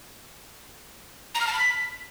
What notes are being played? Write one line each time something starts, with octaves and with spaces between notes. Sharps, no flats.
A#5
F6
A5
B5
B6